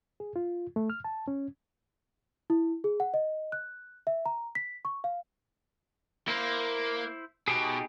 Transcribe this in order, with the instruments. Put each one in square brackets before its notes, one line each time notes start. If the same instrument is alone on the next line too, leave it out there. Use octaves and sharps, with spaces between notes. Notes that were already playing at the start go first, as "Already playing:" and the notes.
[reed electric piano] G#4
F4
A3
F6
A5
C#4
[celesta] E4
G#4
F#5
D#5
F#6
E5
A#5
B6
C#6
F5
[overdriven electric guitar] A#3 [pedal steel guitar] E4 C5
[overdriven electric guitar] B2 [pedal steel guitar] D#4 G4 G#4